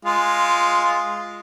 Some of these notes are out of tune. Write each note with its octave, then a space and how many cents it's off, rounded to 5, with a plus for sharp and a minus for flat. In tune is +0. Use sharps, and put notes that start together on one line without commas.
G#3 +0 F4 +0